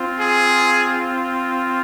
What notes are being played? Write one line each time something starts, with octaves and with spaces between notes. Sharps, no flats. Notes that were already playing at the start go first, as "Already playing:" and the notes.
Already playing: C4 F4
G#4